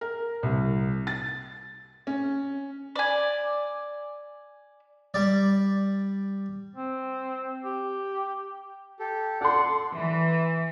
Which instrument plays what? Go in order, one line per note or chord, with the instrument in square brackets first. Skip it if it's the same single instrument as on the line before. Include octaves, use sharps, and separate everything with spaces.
[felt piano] A#4
C2
A6
C#4
[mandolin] D5 G#5
[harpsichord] G3 D5
[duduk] C4
G4
[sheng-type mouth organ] G4 A4
[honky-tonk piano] A4 C6 [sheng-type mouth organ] D5 F#5
[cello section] E3